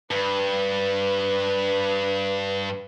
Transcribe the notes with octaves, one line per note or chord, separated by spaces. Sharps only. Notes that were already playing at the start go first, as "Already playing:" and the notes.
G2 B4